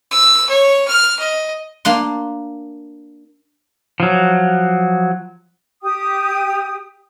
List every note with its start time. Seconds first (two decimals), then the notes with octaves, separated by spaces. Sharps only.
0.11 E6
0.50 C#5
0.87 F6
1.19 D#5
1.85 A#3 D4 C6
4.00 F3 F#3
5.83 G4 G5 D#6